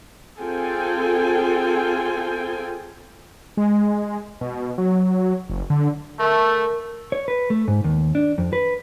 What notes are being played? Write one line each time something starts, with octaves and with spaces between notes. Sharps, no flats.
C4 F4 G#4 A4 G5 G#5
G#3
B2
F#3
F#1
D3
A3 A#4
C#5
B4
A3
G#2
D#2
D4
F2
B4